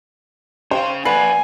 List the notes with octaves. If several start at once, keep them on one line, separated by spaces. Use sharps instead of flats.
C#4 C5 F5 G5
F3 A#3 B4 D5 F#5 G#5 C7